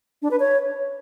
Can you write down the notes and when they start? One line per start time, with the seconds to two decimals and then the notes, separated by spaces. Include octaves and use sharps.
0.22 D4
0.31 B4
0.40 C#5